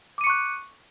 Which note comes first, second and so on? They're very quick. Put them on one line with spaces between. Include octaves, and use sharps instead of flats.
D6 D#7 C#7 C#6 F#6